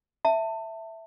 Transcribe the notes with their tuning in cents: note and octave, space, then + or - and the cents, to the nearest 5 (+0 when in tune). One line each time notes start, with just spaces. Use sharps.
E5 +0 A5 +25